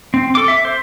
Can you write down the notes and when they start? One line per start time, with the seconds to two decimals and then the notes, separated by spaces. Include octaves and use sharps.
0.14 C4
0.35 A4 D6
0.48 E5
0.65 C5